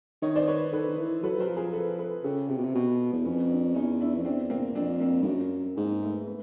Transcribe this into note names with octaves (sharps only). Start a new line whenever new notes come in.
D#3 C#5 D#5
C5 D5
B4 C#5
D#3 A4 B4
D#3
E3
F#3 A4 B4
F#3 A#4 C5
F3
G#4 A#4
A4 B4
A4 B4
C#3 G4 A4
C3 F4 G4
B2
C3
B2
E2
F2 B3 C#4
C4 D4
E2 C#4 D#4
D4 E4
F2
E2 C4 D4
A#3 C4
F2 C4 D4
A#3 C4
G2
F#2
G#2 A#3 C4
A3 B3
A3 B3